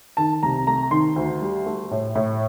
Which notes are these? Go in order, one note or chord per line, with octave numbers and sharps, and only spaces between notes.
D#3 A5
C2 A#5
A3 A#5
D#3 C6
D2
G3
A3
A2
A2